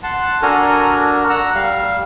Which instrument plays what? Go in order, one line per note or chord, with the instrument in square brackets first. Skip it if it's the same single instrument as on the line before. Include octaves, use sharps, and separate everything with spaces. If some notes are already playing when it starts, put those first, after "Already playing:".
[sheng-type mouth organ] F#5 A5 C6
[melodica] D4 F#4 A#4 [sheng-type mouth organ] A4 G#5 A#5
[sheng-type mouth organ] F#5 A#5 E6
[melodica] G3 [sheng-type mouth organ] F5